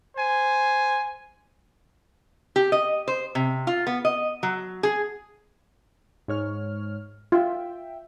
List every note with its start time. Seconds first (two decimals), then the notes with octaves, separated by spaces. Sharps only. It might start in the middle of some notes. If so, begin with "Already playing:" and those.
0.17 C5 G#5
2.56 G4
2.72 D#5
3.08 C5
3.35 C3
3.67 F4
3.87 B3
4.05 D#5
4.43 F#3
4.83 G#4
6.28 G#2 C#5 F6
7.32 F4 E5 G5